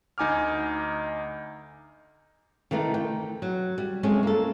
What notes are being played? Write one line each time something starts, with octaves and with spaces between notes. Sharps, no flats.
D2 D#4 G#5 D6 F6
D#3 E3 A3 D#4
G5
F#3
G3
G#3 A3 C4 C#4
A#3 A4